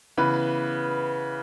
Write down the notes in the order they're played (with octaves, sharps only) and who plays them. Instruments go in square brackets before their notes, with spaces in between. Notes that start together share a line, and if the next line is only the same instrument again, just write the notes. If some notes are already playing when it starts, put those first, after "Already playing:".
[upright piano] C#3 E3 B3 B4 B5